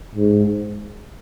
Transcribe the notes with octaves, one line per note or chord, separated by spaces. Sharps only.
G#2